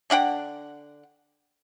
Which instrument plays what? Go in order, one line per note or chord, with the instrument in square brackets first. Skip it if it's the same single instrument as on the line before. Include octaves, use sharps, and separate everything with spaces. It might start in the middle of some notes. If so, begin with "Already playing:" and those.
[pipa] D3 D4 F#5 G5